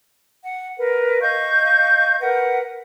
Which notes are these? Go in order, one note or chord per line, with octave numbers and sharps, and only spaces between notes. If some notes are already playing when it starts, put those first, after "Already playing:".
F#5
A#4 B4
D#5 F5 C#6 G6
A#4 B4 F#5